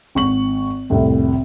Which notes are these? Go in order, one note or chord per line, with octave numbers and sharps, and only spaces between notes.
G#1 C#6 F#7
F1 C2 A2 C3